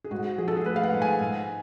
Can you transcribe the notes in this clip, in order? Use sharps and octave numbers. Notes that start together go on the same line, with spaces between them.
G#4
G#2 F#4
F3 G#4
A4
G#4
A3 B4
F5
F#5
G#2
G#5
G#2